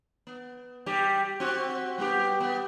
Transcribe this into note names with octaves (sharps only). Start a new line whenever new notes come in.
B3
G3 G4
C4 F#4
G3 B3 G4
B3